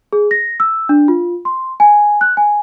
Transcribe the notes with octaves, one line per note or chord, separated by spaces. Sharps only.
G#4
A#6
E6
D4
F4
C6
G#5
F#6
G#5